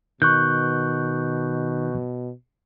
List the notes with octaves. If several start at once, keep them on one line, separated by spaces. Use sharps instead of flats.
B2 D#3 C#6 F#6 G6